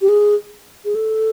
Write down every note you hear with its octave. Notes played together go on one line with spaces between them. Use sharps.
G4
G#4
G#4
A4